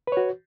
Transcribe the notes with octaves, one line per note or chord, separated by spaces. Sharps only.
F#4 B4 C#5